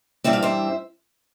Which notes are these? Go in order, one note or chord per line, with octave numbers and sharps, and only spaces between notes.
G2 E3 G3 C4 E5
F5
C5 E5